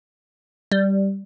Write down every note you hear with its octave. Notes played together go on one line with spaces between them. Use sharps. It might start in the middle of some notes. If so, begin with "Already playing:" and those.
G3